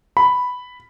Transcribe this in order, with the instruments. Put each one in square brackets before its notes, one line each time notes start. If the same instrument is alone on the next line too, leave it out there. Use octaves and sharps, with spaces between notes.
[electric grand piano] B5